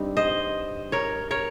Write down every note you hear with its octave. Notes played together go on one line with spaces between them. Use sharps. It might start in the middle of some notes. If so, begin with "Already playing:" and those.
Already playing: G2 G3 C4 D#4
C5 D#5
A#4 C#5
A#4 C#5